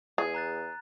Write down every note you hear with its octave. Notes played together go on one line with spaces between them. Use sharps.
E2 G#4
A#5 F#6 A6